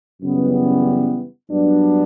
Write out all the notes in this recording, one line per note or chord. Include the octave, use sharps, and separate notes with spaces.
F#2 C#3 E3 G3 B3
G2 F#3 B3 D4